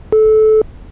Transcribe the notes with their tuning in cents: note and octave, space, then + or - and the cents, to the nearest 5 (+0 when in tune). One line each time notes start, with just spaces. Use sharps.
A4 -20